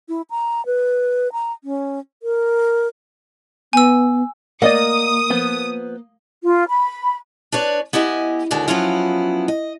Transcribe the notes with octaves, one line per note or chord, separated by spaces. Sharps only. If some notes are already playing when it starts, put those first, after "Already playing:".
E4
A#5
B4
A#5
C#4
A#4
B3 G#5 E6
A#3 D5 D#5 F#5 D#6
F3 B3
F4
B5
D4 B4 C#5 D5
B3 E4 G4 D#5 G#5
D#2 D3 G#3 D4 F#4
F3 F#3 B3 C#4 E4 F4
D#5